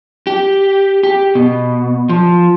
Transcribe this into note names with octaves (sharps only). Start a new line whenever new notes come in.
G4
G4
B2
F3